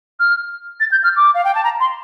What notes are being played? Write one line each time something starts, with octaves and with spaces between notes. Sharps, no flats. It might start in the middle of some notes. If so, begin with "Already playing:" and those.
F6
A6
G6
F6
D6
F5
G5
A5
A#5
C6